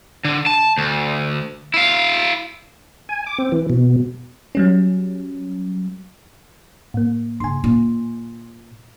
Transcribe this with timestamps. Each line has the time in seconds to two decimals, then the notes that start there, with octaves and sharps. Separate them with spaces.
0.25 D3
0.46 A5
0.78 D2
1.74 E4 F5
3.09 G#5
3.26 D6
3.38 C4
3.52 E3
3.70 B2
4.55 F#3 G3 C#4
6.94 A2 A#3
7.40 G2 C#3 G#5 C6
7.64 A#2 C#4